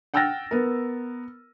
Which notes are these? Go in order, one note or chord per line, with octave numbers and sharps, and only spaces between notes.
F#5 G5 E6 F6 A6 A#6
B3 A#4